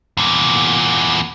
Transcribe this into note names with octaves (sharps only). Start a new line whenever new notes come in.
E2 A#2